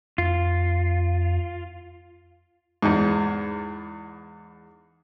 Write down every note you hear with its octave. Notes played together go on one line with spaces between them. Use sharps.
F2 F4
E2 G#2